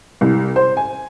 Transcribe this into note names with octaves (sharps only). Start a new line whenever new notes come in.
C2
C5
G#5